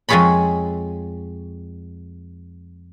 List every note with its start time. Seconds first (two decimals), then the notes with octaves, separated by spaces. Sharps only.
0.09 F2 G#3 F4 G#4 C#5 B5